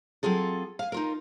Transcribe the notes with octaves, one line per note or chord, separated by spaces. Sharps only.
F#3 C4 F4 G#4 A4
F5 G#5
D#4 F4 A#4